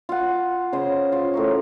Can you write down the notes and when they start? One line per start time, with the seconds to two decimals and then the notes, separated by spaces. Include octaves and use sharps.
0.09 F4 F#5
0.72 C#3 C5 D#5
1.12 F4
1.34 A2 A#4 C#6